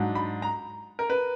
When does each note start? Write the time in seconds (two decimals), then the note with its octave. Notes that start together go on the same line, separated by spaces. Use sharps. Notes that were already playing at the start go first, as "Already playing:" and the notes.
Already playing: G#2 F#3 D4
0.15 B5
0.42 A#5
0.99 A#4
1.10 B4